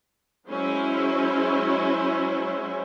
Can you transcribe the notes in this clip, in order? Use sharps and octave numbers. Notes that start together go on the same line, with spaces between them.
F#3 G#3 C#4 E4 C5